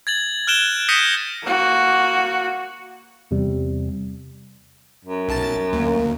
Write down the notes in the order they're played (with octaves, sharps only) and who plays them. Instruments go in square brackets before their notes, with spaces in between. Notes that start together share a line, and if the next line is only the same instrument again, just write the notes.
[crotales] G#6 A6 F#7
F6 F#6 D7 E7 G7
D#6 G6 A#6 B6 C#7 D#7
[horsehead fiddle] A#3 F#4
[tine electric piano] E2 C3 G3
[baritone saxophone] F#2
[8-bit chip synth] B1 A5 A6
[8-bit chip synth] D2 [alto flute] A#3